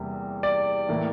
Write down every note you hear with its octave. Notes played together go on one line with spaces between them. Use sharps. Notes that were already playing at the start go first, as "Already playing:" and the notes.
Already playing: E2 C3 G3 A#3
D5
A2 E3 A#3